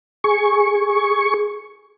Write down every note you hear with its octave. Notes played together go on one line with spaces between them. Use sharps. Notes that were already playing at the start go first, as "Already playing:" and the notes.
G#4 C#6